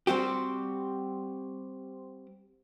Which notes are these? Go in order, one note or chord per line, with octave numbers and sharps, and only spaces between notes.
G3 C4 F#4 G4